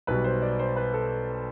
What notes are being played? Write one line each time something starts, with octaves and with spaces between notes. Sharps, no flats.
B1 B2 G3 B4
C5
D5
C5
B4
A4